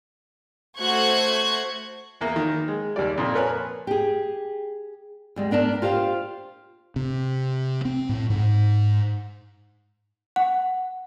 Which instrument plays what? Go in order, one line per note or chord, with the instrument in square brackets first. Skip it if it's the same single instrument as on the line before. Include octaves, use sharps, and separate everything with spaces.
[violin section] A3 F#4 C5 C#6 F#6 G#6
[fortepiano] E2 A#3
D#3
G#3
D#2 G3 D5
F2 A#2
A#4 B4 C#5 G#5
[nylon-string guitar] G4 G#4
D2 G3 G#3
B3 D4 A#4 A5
F4 G4 C5 E5 F5
[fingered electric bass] C3
C4
A2
G#2
[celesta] F#5